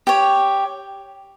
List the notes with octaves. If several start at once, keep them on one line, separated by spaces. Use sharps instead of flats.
G4 C#5